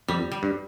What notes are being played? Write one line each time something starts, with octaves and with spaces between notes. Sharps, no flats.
F2 G3
G3
G2